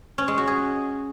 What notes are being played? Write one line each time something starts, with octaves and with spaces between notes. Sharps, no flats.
C#4
G#3
F#4
G#4